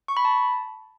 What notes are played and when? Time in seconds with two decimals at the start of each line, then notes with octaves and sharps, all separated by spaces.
0.08 C#6
0.17 B5
0.25 A5